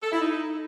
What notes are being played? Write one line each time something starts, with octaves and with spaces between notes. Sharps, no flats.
A4
E4
D#4